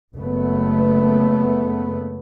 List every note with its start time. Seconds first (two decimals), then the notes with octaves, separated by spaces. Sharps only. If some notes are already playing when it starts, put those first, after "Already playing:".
0.16 F#1 A3 B3